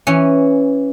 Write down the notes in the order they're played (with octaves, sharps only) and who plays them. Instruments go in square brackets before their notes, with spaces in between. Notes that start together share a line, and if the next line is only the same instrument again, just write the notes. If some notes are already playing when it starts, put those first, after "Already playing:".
[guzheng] E3 C#4